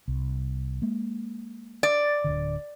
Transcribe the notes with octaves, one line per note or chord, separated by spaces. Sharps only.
C2
G#3 A#3
D5
D1 G#1 D3